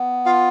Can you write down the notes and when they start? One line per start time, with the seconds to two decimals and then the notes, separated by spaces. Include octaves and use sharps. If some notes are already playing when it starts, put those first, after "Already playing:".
Already playing: B3
0.26 F4 F5